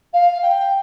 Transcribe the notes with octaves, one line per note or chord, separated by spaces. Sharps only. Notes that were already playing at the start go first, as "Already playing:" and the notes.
F5
G5